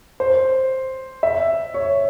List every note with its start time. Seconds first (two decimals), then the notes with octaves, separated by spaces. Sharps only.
0.20 C5
1.23 E5
1.74 C#5